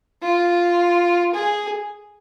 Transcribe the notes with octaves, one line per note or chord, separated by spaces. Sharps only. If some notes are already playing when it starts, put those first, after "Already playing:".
F4
G#4